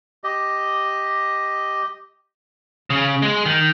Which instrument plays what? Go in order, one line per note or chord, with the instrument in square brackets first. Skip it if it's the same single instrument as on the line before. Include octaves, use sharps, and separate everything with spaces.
[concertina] G4 D#5
[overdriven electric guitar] C#3
G#3
D#3